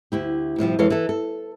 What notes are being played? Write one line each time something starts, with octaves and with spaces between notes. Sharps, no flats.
D2 E4 G4
A2 C3 F3 G3
F2 E3 G#3 A4 C#5 F5
E3 A4
A4